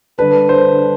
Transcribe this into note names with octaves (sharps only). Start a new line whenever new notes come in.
D3 G3 D4 B4
C5